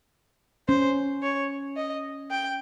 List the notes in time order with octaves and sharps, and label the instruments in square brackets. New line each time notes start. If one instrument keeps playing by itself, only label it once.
[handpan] C#4 [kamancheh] C5
[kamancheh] C#5
D#5
G5